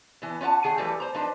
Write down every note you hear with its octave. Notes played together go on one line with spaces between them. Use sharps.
E3 B3
C#4 F4 D5 F#5 A5
D#3 G#4 F#5 G#5
E3 F3 G3 A3 A4 B4
C5 A#5
F3 D4 D#4 B4 C5